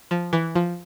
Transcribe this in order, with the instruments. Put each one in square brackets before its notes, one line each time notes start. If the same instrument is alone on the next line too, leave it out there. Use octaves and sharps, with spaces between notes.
[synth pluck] F3
E3
F3